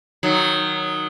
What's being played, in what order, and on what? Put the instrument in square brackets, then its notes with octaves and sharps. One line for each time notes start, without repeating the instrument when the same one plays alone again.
[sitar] D#3 F#3